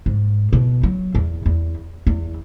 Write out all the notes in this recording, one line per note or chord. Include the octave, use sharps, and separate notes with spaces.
G#2
B2
F#3
E2
E2
E2